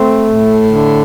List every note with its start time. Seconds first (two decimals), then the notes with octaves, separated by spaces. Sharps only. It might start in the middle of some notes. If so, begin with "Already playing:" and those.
Already playing: A3 C4
0.31 A2
0.71 D3